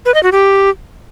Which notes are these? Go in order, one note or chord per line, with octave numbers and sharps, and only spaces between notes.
B4
D#5
F#4
G4